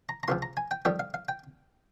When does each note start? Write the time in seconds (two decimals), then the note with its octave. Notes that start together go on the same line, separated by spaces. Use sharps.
0.09 A#5
0.23 A#5
0.28 C#2 C3 F3 C6
0.42 A#5
0.57 G#5
0.71 G5
0.85 F2 D#3 G3 G5
1.00 F5
1.14 F5
1.29 G5